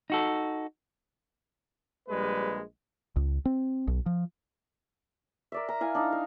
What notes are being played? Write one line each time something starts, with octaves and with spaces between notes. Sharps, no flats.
D#4 F#4 A4
A#1 G3 G#3 B4
C#2
C4
B1
F3
A#4 D5 E5
A#5
E4 F5 G#5
D4 D#4
F5